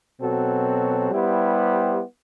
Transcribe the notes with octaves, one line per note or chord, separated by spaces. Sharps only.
B2 F#3 C4 F#4 A4
G3 B3 E4 G4 C5